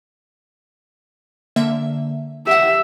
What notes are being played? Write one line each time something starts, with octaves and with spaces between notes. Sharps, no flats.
D3 A#3 E5
G4 E5 F#5